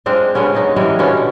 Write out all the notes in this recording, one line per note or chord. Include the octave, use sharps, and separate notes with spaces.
G#3 C4 D4 F4
D3 G#3 B3 C#4
C#3 D#4
E3 G3 G#3 C#5
B2 D3 B3 C#4